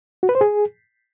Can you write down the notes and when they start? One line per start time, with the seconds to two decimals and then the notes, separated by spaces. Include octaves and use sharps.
0.23 F#4
0.29 B4
0.35 C5
0.41 G#4